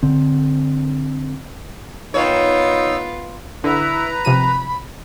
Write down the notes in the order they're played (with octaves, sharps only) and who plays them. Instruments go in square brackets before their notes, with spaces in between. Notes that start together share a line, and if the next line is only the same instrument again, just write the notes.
[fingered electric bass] D3 C4
[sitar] D#3 C#5 [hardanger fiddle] B3 F4 [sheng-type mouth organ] D#4 E6
[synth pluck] D3 [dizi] E4 [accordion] B4 A#5
[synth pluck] C3 F3 D#7 [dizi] B5